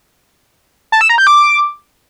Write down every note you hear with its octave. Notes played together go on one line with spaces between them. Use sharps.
A5
E6
A#5
G6
D6